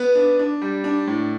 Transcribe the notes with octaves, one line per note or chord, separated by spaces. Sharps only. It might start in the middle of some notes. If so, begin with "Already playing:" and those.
Already playing: B3 B4
D4
D4
G3
D4
A2